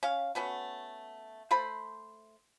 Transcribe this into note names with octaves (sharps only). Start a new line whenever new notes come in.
C#4 F5
A3 B3 C#4 F#4
A3 A4 C5 B5